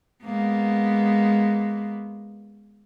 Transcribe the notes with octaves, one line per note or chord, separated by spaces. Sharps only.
G#3 A#3 B3